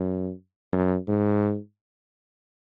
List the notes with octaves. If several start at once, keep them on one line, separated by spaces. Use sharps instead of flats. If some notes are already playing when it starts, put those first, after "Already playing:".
Already playing: F#2
F#2
G#2